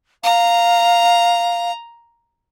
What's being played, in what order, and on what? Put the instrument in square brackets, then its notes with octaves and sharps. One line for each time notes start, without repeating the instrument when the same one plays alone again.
[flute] F5 [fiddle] A#5